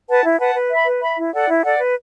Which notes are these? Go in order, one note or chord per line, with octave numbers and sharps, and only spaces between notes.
B4 F#5 A5
E4
B4 F#5 A5
B4
E5 B5
B4
E5 B5
E4
A4 D5 F#5
E4
A4 D5 F#5
B4